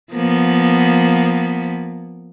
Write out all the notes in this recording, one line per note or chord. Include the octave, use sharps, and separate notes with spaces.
F3 A#3 B3